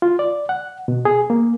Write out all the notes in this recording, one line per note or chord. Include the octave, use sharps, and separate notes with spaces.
F4
D5
F#5
B2
G#4
A#3